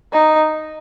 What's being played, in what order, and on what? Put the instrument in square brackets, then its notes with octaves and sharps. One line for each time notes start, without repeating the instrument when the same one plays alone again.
[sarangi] D#4